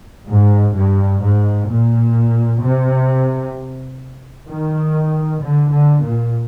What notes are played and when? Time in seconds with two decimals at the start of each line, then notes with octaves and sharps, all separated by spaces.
0.29 G#2
0.75 G2
1.21 G#2
1.68 A#2
2.62 C3
4.47 D#3
5.40 D3
5.70 D3
6.02 A#2